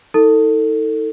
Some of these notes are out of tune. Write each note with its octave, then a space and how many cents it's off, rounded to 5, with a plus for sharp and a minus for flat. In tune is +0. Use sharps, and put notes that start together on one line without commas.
D#4 +45 A4 +25